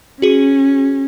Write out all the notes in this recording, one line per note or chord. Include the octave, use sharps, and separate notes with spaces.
C#4 F#4 G#4